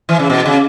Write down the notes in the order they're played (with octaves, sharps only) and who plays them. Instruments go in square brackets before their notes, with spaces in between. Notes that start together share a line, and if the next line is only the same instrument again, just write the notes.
[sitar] E3
C#3
B2
C#3